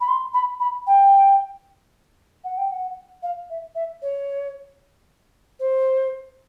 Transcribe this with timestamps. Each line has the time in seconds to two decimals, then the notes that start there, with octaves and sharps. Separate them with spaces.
0.01 B5
0.08 C6
0.34 B5
0.60 B5
0.87 G5
2.44 F#5
2.57 G5
2.71 F#5
3.23 F5
3.50 E5
3.75 E5
4.02 C#5
5.60 C5